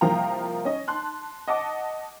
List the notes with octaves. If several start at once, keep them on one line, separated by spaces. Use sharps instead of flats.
C2 F3 A#3 F5 G5 A#5
C#4 D#5
A5 C6 F#6
D#5 F#5 A5 D6